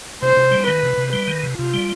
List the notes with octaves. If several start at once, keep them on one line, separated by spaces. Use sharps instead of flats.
C3 C5
C3
G3
D#3 B4
C3
C3
G3 B4
D#3
C3
C3 F4
G3